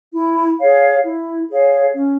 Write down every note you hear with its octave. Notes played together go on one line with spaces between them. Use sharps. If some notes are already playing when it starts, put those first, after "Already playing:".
E4
G#4 C#5 F5
E4
G#4 C#5 F5
C#4